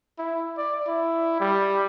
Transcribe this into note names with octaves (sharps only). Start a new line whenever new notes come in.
E4
D5
E4
G3